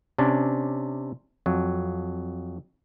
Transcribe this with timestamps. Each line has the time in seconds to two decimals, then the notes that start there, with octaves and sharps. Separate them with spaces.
0.18 C3 C#4 D4
1.46 F2 F#3